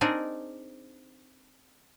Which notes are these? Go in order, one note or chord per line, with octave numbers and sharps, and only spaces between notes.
C4 D4 D#4 G#4 A#4